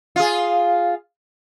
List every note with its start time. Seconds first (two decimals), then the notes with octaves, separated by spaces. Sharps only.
0.16 F4 G#4